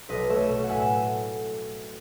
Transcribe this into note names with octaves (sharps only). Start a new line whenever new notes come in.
B1 B4 D#5
A3 C#5 E5
B2
F#5
A2 E5 G#5